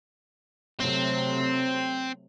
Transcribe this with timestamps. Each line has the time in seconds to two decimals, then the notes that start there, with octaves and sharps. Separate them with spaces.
0.80 C3 F#3 A3 C4